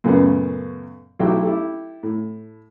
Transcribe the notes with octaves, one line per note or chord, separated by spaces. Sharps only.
F#2 A#2 C#3 A3 B3
B1 F#3 A3 E4 G4 G5
E4 G4 A4
A2